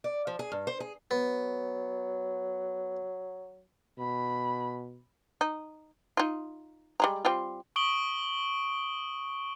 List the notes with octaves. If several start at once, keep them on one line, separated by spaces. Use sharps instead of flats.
D5
F3
G#4
G2
C5
G#4
F#3 B3
B2 B5
D#4
D#4 F4
G3 G#3 A#5
G3 C4 F4
C#6 D#6 D7 F#7 G7